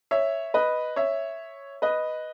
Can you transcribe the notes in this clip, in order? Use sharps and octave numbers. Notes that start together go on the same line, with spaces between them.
C#5 E5
B4 D#5
C#5 E5
B4 D#5